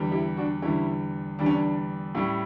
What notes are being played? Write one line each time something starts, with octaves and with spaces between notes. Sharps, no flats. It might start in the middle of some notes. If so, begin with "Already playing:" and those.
Already playing: E2 D3 G3
E4 G4
D4 F#4
E2 D3 G3 C#4 E4
E2 D3 G3 D4
C#4
D4
A2 G3 C#4